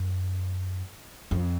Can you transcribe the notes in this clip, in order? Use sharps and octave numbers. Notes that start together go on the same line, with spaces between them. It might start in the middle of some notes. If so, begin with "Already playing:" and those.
Already playing: F#2
F2